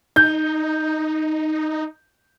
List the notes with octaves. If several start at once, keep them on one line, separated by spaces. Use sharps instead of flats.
D#4 G6